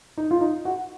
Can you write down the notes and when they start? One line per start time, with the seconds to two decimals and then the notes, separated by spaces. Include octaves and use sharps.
0.17 D#4
0.31 F4
0.41 D#4
0.65 F#4